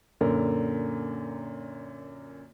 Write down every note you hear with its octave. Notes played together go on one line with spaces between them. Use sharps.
F#2 A#2 D3 A#4